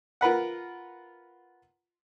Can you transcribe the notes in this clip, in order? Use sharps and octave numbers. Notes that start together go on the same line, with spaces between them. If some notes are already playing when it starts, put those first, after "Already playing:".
F4 A#4 B4 F#5